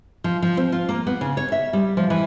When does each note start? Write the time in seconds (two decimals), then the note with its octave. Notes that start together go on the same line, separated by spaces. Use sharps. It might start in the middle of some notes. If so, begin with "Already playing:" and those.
0.24 F3
0.42 F3
0.57 C4
0.72 F4
0.89 A#3
1.07 B3
1.21 C#3
1.37 C#5
1.52 E5
1.73 G3
1.97 F3
2.10 E3